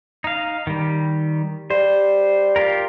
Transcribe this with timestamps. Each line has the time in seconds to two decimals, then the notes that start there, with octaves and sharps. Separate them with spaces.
0.24 D#4 F5
0.67 D#3 G3
1.70 G3 C5
2.56 F4 G4 A#4